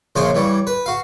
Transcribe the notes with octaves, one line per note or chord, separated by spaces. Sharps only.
A#1 C#3 F3 C5 C#5 G#5
E3 G3 C#5
B4
F#4 F5